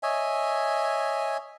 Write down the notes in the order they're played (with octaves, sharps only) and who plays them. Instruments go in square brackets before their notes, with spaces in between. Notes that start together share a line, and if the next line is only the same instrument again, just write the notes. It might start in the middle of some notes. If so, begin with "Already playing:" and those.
[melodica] C#5 D#5 E5 G#5